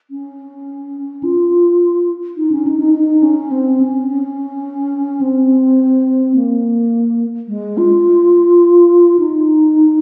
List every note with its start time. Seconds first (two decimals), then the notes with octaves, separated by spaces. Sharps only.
0.11 C#4
1.23 F4
2.37 D#4
2.52 C#4
2.66 D#4
2.80 D#4
2.94 D#4
3.22 C#4
3.51 C4
3.80 C#4
4.08 C#4
5.21 C4
6.35 A#3
7.48 G#3
7.77 F4
9.19 D#4